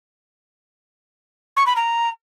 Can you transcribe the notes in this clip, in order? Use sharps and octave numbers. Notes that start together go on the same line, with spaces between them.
C#6
B5
A#5